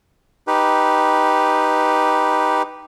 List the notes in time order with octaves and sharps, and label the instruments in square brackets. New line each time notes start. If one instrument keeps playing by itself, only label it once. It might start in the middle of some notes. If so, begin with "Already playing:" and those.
[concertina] D#4 G4 B4